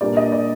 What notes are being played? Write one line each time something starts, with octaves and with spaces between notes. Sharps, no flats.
A#2 G3 A#3 D4 D5
D#5
D5